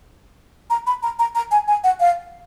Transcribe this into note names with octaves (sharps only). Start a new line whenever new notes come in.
A#5
B5
A#5
A#5
A#5
G#5
G#5
F#5
F5